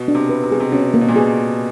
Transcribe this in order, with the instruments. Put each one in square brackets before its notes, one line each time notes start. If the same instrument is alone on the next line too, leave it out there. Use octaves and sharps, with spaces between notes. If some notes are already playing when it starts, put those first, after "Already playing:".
Already playing: [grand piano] B2
[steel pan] D4
[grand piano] C3
[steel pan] B4
[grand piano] C3
[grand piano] B2 [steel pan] G#4
[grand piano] C3
[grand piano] B2 [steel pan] C#4
[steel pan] A#3
[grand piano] B2
A#2
[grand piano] B2 [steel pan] G#4